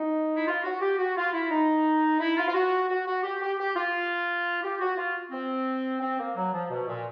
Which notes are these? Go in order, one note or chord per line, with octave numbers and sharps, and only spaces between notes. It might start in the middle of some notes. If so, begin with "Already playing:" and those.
Already playing: D#4
E4
F4
F#4
G4
F#4
F4
E4
D#4
E4
F4
F4
F#4
F#4
F#4
G4
G4
G4
F4
G4
F#4
F4
C4
C4
A#3
F#3
F3
B2
A#2